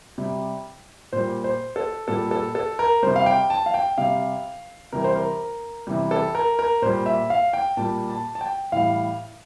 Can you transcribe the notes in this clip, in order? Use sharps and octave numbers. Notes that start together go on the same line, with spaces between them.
C3 G3
A#2 G3 C5
C5
A4
A#2 G3 A4
A4
A4
A#4
C3 G3 C5
F5
G5
A5
F5
G5
C3 G3 F5
C3 E3 G3 A#4
C5
A#4
C3 E3 G3
A4
A#4
A#4
A#2 G3 C5
E5
F5
G5
A#2 G3 A5
A5
A5
G5
A2 E3 G3 F5